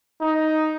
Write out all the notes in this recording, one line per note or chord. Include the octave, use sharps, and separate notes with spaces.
D#4